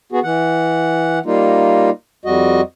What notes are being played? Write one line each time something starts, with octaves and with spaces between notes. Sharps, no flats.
B3 F#4 G#4
E3 F#5
G3 A#3 D#4 F4
F2 G3 F#4 D#5